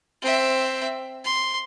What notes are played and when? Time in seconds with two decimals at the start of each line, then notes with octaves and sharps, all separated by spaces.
0.21 C4 E5
1.25 C6